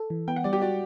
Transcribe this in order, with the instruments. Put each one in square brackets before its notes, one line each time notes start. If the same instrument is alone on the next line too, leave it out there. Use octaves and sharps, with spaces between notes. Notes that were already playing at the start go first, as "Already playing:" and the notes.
Already playing: [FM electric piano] A4
E3
[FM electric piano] B3 [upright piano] G5
[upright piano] F#5
[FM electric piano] G3 [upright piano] D5
[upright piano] G4
[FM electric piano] F#4 [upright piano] D5